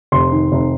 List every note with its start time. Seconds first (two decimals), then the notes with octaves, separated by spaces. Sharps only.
0.12 F1 C6
0.32 D#3
0.52 F1